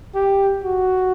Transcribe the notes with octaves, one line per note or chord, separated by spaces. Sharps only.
G4
F#4